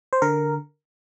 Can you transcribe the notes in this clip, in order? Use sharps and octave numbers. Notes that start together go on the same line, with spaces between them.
C5
D3 A#4